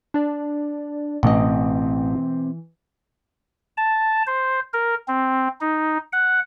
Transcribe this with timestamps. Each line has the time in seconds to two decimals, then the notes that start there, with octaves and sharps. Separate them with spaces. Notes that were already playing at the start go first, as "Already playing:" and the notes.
0.14 D4 D5
1.23 A1 B2 E3 A3 C4 D#5
3.77 A5
4.27 C5
4.73 A#4
5.08 C4
5.61 D#4
6.13 F#5